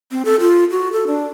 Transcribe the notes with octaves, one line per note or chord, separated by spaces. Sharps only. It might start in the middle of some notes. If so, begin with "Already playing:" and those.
C4
A4
F4
F#4
A4
D4